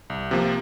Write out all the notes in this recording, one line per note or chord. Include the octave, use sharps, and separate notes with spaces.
C2
C3 F3 A#3